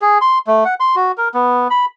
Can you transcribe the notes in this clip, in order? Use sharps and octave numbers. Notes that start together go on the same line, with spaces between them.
G#4
C6
A3
F#5
C6
F#4
A#4
B3
B5